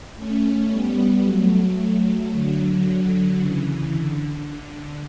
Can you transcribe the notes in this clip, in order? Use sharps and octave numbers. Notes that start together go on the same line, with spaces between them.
A3 C#4
G3 B3
F#3 A3
D3 F#3
C#3 E3
D3
D3